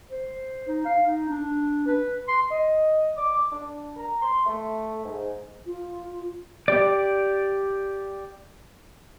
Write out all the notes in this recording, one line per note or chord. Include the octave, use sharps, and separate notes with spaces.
C5
D#4
F5
D#4
D4
B4
C6
D#5
D6
D4
A#5
C6
A3
G#2
F4
G4 D5